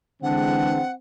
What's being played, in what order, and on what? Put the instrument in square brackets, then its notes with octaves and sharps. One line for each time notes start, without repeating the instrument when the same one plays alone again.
[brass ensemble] D3 E3 G#3 [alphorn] C4 [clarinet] D4 [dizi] F#5